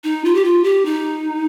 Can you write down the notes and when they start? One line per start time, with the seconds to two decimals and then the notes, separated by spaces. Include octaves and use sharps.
0.04 D#4
0.25 F4
0.35 G4
0.45 F4
0.64 G4
0.85 D#4